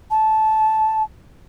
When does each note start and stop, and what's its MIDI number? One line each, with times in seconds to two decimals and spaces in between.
0.10 1.03 81